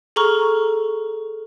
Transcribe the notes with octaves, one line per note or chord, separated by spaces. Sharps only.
G#4 A4 A#5 C#6 F6